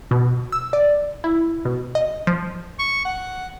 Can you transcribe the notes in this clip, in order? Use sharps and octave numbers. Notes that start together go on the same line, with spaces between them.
B2
E6
D5
E4
B2
D#5
F3
C#6
F#5